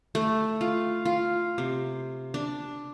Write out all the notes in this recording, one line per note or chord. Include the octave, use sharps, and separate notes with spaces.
A3
F4
F4
C3
D4